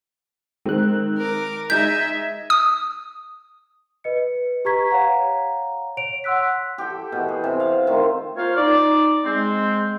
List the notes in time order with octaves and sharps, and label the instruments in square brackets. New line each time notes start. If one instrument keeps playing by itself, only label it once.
[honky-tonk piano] D#3 C4 [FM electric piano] G#3 F#6
[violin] A#4 D6
[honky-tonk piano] G#3 D#4 [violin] D#5 E5 [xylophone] G6 [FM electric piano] G#6 B6
[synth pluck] D#6
[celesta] B4 D#5 C#7
G4 B4 A#5 C#6 G#6 B6
C#5 F5 F#5 A#5
C#5 D7 F7
F#5 C6 E6 F#6 B6
[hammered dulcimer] G4 A4 G5
B2 E3
G#4
C3
F5
D#3 A3 F4
[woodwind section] A#3 F4 C5 C#5 F5
D#4 D5
G#3 C4